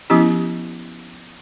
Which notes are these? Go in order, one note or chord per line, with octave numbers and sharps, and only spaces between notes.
F3 B3 C#4 E4 G4